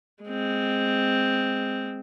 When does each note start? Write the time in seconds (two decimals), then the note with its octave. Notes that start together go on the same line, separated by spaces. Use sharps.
0.24 G#3 C4